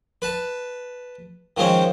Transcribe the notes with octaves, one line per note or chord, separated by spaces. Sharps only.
B4 A5
D#3 F3 G#3 C4 C#4